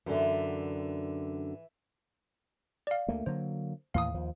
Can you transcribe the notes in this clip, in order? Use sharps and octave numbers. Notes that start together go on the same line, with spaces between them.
F#2 D3 E3
D5 F5
D2 A3 A#3
D3 F#3 A#3 C5
D#2 A2 E3 F5 D#6
D#2 F3